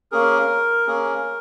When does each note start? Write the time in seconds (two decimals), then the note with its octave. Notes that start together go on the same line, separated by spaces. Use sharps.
0.12 A#3 C#4 G#4 A#4
0.87 A#3 C#4 G#4